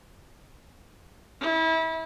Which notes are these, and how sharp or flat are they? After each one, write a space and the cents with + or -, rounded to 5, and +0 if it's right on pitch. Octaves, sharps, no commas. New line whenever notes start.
E4 -30